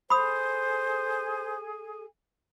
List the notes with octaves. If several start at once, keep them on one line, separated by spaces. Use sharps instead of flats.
G#4 A4 C5 G#5 B5 D#6